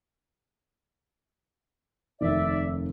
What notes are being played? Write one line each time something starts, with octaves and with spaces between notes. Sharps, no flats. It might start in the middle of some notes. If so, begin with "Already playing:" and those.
F1 D#2 C4 D5 E5